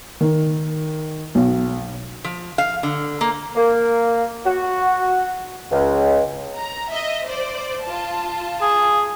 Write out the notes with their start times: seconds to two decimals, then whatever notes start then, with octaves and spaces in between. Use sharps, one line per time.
0.21 D#3
1.35 B1
2.24 F3
2.58 F5
2.83 D3
3.21 A#3
3.56 A#3
4.45 F#4
5.71 C#2
6.57 A#5
6.90 D#5 E5
7.26 C5 D5
7.84 F4 A5
8.61 G#4